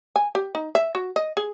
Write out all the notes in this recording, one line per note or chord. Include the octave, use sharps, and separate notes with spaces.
G#5
G4
D#4
E5
F#4
D#5
G#4